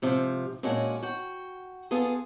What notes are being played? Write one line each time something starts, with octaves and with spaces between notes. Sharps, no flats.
G#2 C3 F3
A#2 G#3 C#4 D4 F#4
F#4 G5
B3 F4 G#4 A4